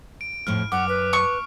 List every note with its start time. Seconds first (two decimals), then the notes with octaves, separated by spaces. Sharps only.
0.21 D7
0.47 F2 A2 F3 F6
0.72 F#2 F#5 D6
0.88 B4
1.13 C#6